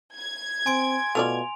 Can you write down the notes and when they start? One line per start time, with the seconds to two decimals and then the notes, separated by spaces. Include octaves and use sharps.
0.16 G#6
0.66 C4 G#5 C6 D7
1.15 B2 A3 F4 D5 F7